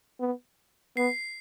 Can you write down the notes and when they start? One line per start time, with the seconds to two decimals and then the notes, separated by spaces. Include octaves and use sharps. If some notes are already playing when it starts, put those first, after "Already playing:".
0.20 B3
0.97 B3 C7